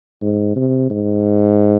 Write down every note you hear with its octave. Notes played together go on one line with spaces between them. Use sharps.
G#2
C3
G#2